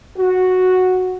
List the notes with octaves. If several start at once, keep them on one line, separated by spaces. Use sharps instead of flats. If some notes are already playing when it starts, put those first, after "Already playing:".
F#4